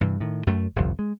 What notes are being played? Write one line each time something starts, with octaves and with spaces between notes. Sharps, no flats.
G2 C3 E3
A2 D#3
F#2 A3
G1 C2 F2 F3
G#3